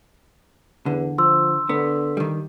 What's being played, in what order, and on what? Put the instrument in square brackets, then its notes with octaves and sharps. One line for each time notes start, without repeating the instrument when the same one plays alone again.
[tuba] E2 [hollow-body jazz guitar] D3
[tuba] F3 [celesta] C6 E6
[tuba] D3 [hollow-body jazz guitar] B3
[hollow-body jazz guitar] D#3 G3